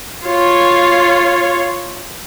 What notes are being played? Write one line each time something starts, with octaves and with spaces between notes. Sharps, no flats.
F4 C#5